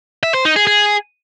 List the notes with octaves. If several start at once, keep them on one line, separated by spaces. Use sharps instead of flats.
E5
C5
D#4
G#4
G#4